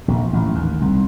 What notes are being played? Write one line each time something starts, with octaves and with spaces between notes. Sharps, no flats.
A#1
A1
D#2
C2